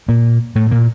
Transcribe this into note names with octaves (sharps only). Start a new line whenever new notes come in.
A#2 A#3
A2 A3
A#2 A#3